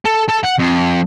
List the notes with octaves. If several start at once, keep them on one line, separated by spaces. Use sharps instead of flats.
A4
A4
F#5
F2